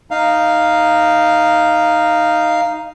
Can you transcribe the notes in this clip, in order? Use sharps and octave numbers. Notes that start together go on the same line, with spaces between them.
D#4 F5